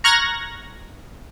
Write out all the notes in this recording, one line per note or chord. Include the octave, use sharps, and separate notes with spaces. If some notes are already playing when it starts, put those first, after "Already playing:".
A#5 C#6 F6 F#6 G#6 A#6